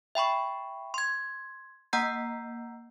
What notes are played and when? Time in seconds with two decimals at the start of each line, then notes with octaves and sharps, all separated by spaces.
0.15 E5 G5 B5 C#6
0.94 C6 G#6
1.93 A#3 F#5 A#5 E6 G6 C7